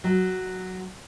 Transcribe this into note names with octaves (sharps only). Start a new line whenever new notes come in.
F#3